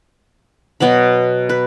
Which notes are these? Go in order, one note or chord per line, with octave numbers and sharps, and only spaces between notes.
B2 F#3 B3 B5
B4